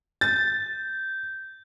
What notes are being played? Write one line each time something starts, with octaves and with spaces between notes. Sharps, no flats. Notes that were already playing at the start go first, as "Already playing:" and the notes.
G6 A6